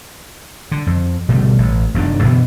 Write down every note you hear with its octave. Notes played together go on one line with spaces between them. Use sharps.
D3
F2
B2 D3 G3 A3
A1
F1 F#2 D#3 D4
F#2 B2 D3 E3